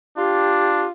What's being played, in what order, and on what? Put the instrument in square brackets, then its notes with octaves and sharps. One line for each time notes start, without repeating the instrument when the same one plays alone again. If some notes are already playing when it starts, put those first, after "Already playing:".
[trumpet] D4 [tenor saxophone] F4 [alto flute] G4